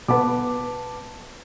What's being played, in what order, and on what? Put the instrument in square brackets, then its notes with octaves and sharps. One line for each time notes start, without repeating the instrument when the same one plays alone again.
[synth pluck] B2 B3 [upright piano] B4 A5 D6